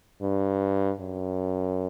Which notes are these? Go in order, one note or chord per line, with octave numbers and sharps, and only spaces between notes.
G2
F#2